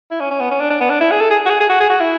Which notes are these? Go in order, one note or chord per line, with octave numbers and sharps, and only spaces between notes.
E4
C#4
C#4
B3
C#4
D4
D4
B3
D4
E4
G#4
A4
G#4
F#4
G#4
G#4
F#4
G#4
F#4
E4